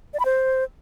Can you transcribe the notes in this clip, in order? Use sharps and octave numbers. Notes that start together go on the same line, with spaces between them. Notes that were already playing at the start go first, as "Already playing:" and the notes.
D5
B5
C5